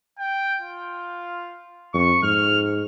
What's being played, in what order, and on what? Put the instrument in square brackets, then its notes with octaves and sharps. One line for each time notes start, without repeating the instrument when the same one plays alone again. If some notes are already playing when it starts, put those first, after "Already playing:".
[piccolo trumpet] G5
F4
[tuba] F2 [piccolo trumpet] C#6
[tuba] G#2 [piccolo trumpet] F6